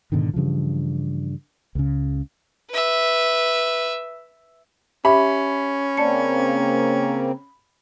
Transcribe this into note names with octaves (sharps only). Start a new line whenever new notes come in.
G#2 B2 D3 D#3
G2 C#3 E3 F3
C#2 C#3
B4 E5
C#4 G4 E5 B5
C#3 A#3 C4 D5 A5 C#7